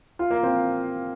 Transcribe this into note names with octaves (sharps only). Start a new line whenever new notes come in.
F4
A#3
C4